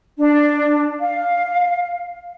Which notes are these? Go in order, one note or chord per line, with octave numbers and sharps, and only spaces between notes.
D4
F5